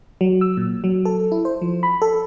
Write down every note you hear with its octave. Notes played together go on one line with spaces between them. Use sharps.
F#3
E6
A#2
F#3
A4
E4
C5
F3
B5
A4